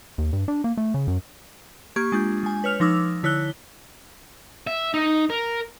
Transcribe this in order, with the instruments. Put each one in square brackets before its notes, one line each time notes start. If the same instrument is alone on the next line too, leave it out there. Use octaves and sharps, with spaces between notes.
[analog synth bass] D#2
G2
D4
A#3
A3
C#3
F#2
[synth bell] A#3 G4 C#6 G#6
G#3 D4 F4 G6
G#3 G#5
B4 C#5 F6 F7
F3 D#4 D6 E6
D3 E4 C#5 E6 F#6 G7
[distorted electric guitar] E5
D#4
A#4